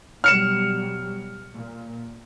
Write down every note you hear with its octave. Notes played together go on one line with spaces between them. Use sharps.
B2 F#3 G3 F6 C#7 E7
A#2